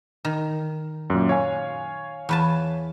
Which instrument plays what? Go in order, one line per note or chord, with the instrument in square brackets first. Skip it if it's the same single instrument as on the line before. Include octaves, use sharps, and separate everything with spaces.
[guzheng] D#3
[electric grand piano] F#2 A#2
C#5 F5 G#5
[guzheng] E2 B4 A5